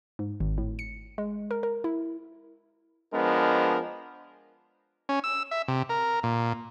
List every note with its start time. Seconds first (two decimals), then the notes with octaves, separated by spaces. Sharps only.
0.19 G#2
0.40 G#1
0.58 A2
0.79 C#7
1.18 G#3
1.51 A#4
1.63 A#4
1.84 E4
3.14 F3 G#3 B3 D4 A#4
5.09 C#4
5.24 E6
5.51 E5
5.68 C3
5.89 A#4
6.23 A#2